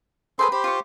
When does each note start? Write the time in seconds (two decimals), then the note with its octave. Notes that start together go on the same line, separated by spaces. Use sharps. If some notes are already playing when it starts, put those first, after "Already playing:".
0.39 G#4 A4 B4 C5 G5 C6
0.52 G4 C5 B5
0.64 F4 C#6